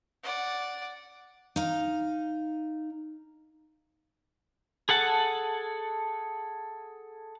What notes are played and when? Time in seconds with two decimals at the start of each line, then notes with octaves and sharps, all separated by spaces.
0.23 D5 F#5
1.56 D#4 F5
4.89 G#4 A4 F#5 A5